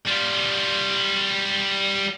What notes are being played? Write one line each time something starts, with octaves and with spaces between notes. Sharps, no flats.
G3 F4